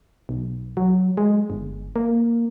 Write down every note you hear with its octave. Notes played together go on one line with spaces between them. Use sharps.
B1
F#3
G#3
G1
A#3